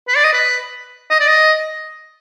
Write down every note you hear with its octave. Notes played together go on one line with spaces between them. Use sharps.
B4
D5
D#5
B4
D#5
D5
D#5